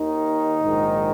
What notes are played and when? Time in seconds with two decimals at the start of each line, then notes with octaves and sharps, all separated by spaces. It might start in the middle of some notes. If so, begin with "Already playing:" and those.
Already playing: D#2 D#3 D#4
0.61 A#1 G#2 D#3